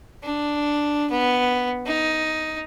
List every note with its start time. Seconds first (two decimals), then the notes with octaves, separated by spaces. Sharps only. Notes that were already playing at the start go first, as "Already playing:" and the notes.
0.23 D4
1.10 B3
1.86 D#4